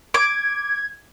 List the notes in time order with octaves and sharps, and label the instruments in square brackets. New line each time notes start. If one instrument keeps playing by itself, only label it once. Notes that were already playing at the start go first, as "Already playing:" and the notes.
[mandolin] D6 [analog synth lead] G#6